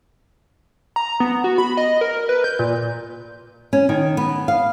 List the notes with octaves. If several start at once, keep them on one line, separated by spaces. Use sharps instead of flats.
A#5
B3
F#4
B5
D#5
A#4
B4
G6
A#2
C#4
D#3
B3
F5